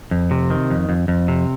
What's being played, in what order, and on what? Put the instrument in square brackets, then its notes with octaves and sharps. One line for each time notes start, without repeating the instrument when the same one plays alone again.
[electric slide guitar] F2
C3
D#3
F2
F2
F2
C3